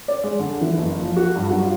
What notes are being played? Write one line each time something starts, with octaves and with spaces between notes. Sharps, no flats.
D5
G#3
D3
E3
F#1
F3
F#4
G2
F#3
F4